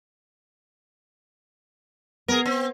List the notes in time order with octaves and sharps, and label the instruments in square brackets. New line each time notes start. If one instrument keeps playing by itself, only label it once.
[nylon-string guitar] B3 [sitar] G#4 A#4
[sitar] C4